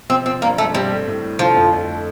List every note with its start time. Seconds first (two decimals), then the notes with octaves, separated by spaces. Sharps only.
0.09 F3 C4
0.26 F3 C4
0.42 G2 A#3
0.58 G2 A3
0.75 G3 C4
0.91 A3
1.07 A2
1.24 A2
1.39 D3 F3
1.56 F2
1.72 A3